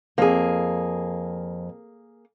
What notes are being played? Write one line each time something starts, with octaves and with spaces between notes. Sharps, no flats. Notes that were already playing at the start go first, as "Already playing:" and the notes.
F2 A#3 G#4